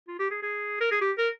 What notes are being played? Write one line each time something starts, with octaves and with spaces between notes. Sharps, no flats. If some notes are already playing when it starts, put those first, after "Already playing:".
F4
G4
G#4
G#4
A#4
G#4
G4
A#4